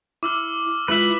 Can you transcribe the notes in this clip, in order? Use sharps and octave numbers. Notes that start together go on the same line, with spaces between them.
E4 D6 E6 F6
G#3 E4 F4 B4 E5 F#7